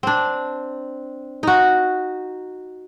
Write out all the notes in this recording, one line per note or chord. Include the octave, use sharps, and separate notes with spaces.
C4 D4
D#4 F#4